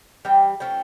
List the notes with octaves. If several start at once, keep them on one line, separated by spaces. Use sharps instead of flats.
E3 G3 G5
F3 A3 C#4 G5